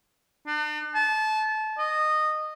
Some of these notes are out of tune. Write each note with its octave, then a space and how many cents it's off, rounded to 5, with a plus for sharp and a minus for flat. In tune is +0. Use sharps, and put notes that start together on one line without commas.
D4 +45
A5 -25
D#5 -15